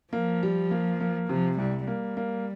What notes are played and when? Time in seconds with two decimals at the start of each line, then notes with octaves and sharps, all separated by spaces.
0.13 F3 A#3
0.43 G3
0.71 A#3
1.00 A#3
1.29 C3 F3
1.58 C2 G3
1.87 G3 A#3
2.17 A#3